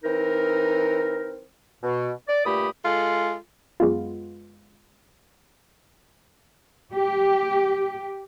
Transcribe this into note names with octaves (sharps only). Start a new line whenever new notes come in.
E3 C4 D#4 A#4
B2
D5
G2 A#2 A3 G4 B5 D#6
G#3 F4 A4
F#2 G#3 B3 F4
G4